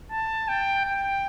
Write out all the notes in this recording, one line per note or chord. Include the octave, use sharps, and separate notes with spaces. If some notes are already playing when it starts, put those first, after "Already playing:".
A5
G5
G5